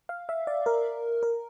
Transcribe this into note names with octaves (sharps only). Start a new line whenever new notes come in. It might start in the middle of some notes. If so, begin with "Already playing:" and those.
F5
E5
D5
A#4
A#4